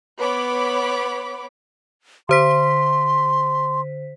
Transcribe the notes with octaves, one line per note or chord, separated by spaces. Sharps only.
B3 C#5 B5 D6
D3 C5 C6 B6